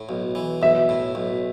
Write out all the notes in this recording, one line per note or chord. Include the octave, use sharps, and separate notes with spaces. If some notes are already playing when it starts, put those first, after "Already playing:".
Already playing: A2
B1
E3
B1 E5
A2
B1